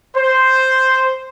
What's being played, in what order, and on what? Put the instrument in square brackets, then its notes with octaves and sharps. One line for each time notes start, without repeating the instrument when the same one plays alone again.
[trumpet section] C5